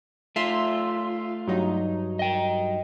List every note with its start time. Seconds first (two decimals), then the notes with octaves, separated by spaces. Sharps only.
0.36 A3 F4 E5 C6
1.47 G2 F#3 D#4
2.19 D#5 G5